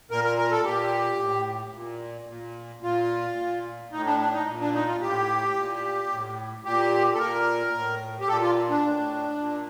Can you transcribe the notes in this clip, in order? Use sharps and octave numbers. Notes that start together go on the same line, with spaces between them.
A#2 A#4
A#4
A#4
A4
A#2 G4
A2
A#2
A#2
A#2 F4
A#2
A2 D#4
D4
D4
D#4
A#2
D4
D#4
F4
A2 G4
A#2
A2
A#2 G4
A4
A#2 A#4
A2
G4
A#2 A4
F4
D4
A2
A#2